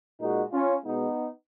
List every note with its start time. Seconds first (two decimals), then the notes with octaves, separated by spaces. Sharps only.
0.20 A#2 G#3 D#4 F#4
0.52 C#4 F4
0.84 B2 G#3 B3 D#4